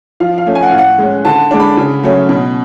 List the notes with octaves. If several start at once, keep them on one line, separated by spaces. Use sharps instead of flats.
F3 F5
F5
A3 C#4
G#5
F#5
A2 F5
F#5
G#3 C#4
D3 A5
G#3 D4
B5
C#3
F#3 A3 C#4
B2